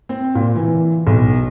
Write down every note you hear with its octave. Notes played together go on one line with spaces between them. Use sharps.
C4
A#2
E3
B1